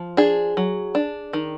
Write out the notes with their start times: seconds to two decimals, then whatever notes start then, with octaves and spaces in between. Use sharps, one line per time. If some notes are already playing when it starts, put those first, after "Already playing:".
Already playing: F3
0.17 D4 G#4
0.57 F#3
0.95 D4
1.33 D#3